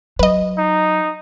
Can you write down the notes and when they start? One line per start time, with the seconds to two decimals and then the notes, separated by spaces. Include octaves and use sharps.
0.19 F#3 B4 D#5
0.58 D#4